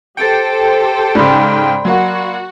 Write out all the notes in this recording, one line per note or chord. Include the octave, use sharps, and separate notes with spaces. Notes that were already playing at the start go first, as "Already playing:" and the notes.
G4 A4 C5 G5 A6 C#7
G#2 C#3 D5 B5 C6
F#3 A#3 F#4